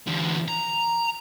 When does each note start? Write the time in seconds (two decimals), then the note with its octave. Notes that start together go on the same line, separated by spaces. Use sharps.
0.07 E2 D3
0.48 A#5